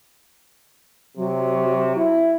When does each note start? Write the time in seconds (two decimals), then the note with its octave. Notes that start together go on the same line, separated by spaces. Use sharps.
1.17 C3 F#3
1.96 E4